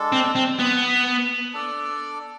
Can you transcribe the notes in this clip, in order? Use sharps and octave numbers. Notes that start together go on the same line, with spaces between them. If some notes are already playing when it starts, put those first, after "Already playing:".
Already playing: G#3 D4 A4
C4
C4
B3
D4 A4 D5